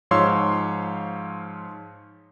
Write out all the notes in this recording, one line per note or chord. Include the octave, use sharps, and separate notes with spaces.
G#2 F3 C#5 F5 C6 E6